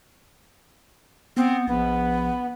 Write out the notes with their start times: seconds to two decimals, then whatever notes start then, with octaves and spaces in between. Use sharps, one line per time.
1.37 B3 C4
1.68 A#1 B3